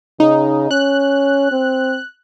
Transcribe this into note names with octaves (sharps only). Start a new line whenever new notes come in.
C#3 D#4
C#4 F#6
C4